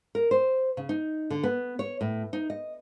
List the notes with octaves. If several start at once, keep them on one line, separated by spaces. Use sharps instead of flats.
A#4
C5
C#3
D#4
D3
B3
C#5
A2
D#4
D#5